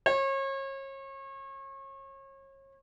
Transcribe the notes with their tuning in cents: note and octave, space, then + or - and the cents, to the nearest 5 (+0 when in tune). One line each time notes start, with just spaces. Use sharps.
C#5 -35